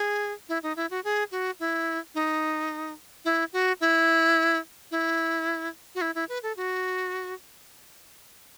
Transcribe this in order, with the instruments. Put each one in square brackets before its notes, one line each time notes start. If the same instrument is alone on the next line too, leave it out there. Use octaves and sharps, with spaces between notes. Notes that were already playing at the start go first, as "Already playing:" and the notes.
Already playing: [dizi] G#4
E4
D#4
E4
F#4
G#4
F#4
E4
D#4
E4
F#4
E4
E4
F#4
E4
E4
B4
A4
F#4